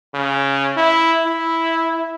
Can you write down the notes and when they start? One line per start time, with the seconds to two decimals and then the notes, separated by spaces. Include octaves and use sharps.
0.14 C#3
0.77 E4
1.26 E4